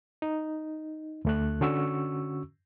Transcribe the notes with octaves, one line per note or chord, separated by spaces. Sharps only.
D#4
D2 A3 F#6
D3 C#4 F#4 C#6 E6